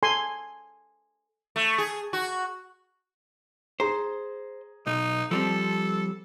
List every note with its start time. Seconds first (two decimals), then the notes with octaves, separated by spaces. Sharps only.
0.03 A4 G#5 C6
1.56 A3
1.78 G#4
2.13 F#4
3.80 G#4 C5 A#5
4.86 B1 D#4
5.31 F3 G3 C4 A4